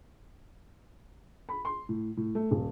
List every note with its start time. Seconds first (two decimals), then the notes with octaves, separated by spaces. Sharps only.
1.49 B5
1.65 C6
1.89 A2
2.17 A2
2.35 A3
2.51 D#1